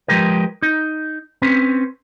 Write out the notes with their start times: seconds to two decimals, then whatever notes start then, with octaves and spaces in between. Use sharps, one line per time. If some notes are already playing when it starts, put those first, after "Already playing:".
0.08 F3 F#3 G#3 G4 A#4 B4
0.62 D#4
1.42 C4 C#4 B4